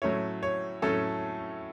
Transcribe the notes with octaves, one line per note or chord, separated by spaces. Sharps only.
A2 F#3 A3 C#4 E4 C#5
C#5
A2 F#3 A3 C#4 E4 A4